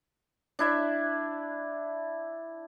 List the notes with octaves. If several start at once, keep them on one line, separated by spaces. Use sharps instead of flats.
D4 E4 E5